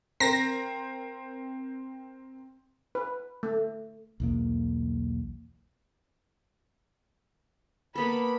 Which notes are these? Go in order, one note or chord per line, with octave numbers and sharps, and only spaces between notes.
C4 A#4 C5 A#6
B4
A3
B1 E2 A#3
A#3 B3 A4 B5